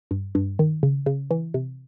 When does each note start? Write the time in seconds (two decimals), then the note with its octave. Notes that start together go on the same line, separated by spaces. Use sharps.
0.11 G2
0.35 G2
0.59 D#3
0.83 C#3
1.06 C#3
1.31 E3
1.54 C3